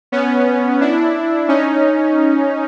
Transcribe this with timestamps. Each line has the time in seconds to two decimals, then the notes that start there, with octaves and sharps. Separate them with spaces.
0.12 B3 C#4
0.81 D4 E4
1.48 C#4 D#4